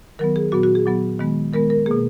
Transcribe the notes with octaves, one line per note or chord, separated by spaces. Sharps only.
D#3 F#3 B3 A#4
G#4
A#2 F#3 B3 F#4
F#4
G#4
A#2 F#3 B3
D#3 G#3 B3
D#3 G#3 B3 A#4
A#4
B2 A#3 G#4